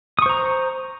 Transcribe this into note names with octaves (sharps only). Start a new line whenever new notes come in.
C5 A#5 C#6 D#6